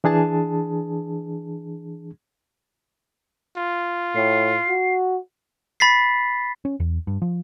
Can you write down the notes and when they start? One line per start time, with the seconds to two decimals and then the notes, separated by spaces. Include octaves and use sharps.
0.04 E3 D4 G#4 A5
3.57 F4
4.15 A2 C7
4.68 F#4
5.80 B5 A6 B6 C7
6.65 C#4
6.80 E2
7.07 G2
7.22 F3